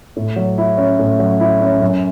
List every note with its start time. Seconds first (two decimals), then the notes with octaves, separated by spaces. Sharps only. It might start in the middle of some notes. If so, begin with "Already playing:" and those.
0.16 A2
0.36 F#3
0.58 E4
0.78 C#4
0.99 A2
1.19 F#3
1.40 E4
1.61 C#4
1.81 F#2